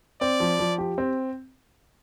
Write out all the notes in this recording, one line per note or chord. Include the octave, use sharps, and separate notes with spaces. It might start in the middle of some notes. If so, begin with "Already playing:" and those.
C4 D5
F3
F3
G4
C4